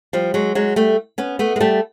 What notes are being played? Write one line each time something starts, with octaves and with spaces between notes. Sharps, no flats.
F3 G3
F#3 G#3
F#3 G#3
G3 A3
B3 C#4
A3 B3
G#3
G3 A3